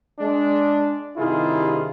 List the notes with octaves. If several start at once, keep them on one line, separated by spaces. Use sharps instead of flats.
G#3 D4
G2 C3 D#3 E4 F4 G#4